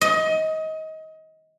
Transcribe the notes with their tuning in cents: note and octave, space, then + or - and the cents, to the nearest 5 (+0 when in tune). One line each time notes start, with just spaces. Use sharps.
D#5 +25